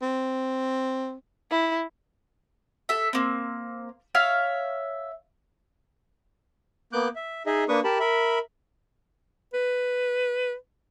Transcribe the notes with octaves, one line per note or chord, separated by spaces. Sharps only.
C4
E4
A4 E5
A#3 C4
C#5 E5 F5 F6
A#3 B3 D6 F#6 G6
E5
D#4 G#4 D#5 E5
A#3 D4 B4 C#6 D#6
G4 A#4 A5 B5
A#4 E5 B5
B4